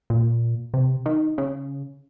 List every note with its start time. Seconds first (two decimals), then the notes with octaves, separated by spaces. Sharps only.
0.10 A#2
0.74 C3
1.06 D#3
1.38 C#3